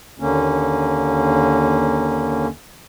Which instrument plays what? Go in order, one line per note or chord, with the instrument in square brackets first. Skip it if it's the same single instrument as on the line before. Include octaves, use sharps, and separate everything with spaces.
[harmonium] D#2 D3 A#3 C#4